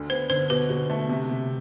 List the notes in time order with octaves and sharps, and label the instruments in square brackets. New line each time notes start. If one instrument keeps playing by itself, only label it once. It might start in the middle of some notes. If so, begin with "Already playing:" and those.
Already playing: [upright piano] D2 D3
[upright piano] B3 [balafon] C5
[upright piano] D3 [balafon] C5
[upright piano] B2 [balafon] B4
[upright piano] B2
A3
C3
C3